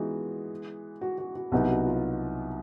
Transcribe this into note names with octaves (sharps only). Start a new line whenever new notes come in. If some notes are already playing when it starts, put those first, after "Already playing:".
Already playing: E3 G#3 B3 D#4 F4 F#4
F#4
F#4
F#4
C2 B2 F#3 B3 D#4 G4
F#4
F4